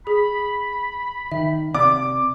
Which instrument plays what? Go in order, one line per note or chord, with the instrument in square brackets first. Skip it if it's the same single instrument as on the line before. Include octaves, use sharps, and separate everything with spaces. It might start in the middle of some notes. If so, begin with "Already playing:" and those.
[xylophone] G#4 [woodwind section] B5
[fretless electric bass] D#3 [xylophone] E5
[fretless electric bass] C3 [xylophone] D5 [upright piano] D6